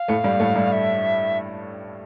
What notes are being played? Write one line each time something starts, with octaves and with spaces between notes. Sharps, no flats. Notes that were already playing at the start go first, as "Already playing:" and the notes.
Already playing: F5
A2 A3
G2 G3
A2 A3
G2 G3
E5